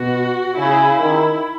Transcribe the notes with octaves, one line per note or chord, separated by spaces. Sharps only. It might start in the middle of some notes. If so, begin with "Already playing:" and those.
Already playing: B2 F#4
C#3 E4
D#3